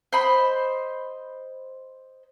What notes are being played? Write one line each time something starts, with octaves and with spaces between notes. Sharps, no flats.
C5 D#5 B5